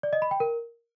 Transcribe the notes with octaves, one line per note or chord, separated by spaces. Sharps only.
D5
D#5
B5
G5
A#4